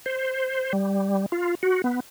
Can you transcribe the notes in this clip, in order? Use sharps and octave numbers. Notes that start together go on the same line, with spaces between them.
C5
G3
F4
F#4
B3